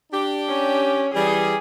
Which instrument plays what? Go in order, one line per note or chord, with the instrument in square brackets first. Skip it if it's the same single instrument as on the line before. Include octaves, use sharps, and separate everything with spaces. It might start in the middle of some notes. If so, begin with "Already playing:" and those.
[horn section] D4 G4
[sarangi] C#4
[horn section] E3 G3 [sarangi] G#4